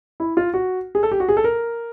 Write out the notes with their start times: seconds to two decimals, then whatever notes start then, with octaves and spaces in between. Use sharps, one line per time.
0.20 E4
0.37 F4
0.54 F#4
0.95 G#4
1.03 A4
1.12 G4
1.20 F#4
1.29 G#4
1.37 A4
1.44 A#4